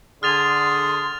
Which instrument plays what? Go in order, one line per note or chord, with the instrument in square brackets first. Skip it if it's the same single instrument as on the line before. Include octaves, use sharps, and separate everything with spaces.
[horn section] D3 G#4 [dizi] C6 [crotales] F6 A6 F7